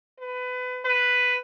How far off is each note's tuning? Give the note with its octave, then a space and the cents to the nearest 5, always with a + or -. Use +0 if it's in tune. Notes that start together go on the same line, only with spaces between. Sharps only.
B4 +25
B4 +5